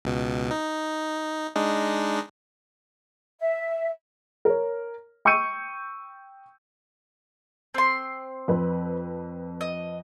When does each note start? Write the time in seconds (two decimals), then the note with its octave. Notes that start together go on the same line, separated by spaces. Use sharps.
0.05 C#2 B2
0.51 D#4
1.56 G#3 D4 D#4
3.39 E5
4.45 A#4 C#5
5.25 G5 C#6 E6 G6 C#7 D#7
7.74 C4 C6
8.48 F2 B4
9.61 D#5